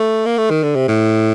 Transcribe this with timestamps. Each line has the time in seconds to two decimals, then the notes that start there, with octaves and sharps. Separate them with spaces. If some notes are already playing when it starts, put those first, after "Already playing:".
Already playing: A3
0.26 A#3
0.38 A3
0.50 D#3
0.63 D3
0.75 C3
0.88 A2